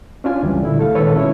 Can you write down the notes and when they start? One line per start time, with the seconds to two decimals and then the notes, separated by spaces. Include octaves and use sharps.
0.24 C#4 D4 F4 G#5
0.43 C#2 E3 G3
0.62 A#2 D3 E4
0.79 A3 A4 F5
0.95 A#2 D#3 G#3 A4 B4 C#5
1.14 B2 C#4 E4 C#5